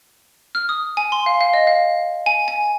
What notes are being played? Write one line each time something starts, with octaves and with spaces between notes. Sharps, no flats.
F6
D#6
G#5
C6
F5
F5
D#5
F5
G#5
G#5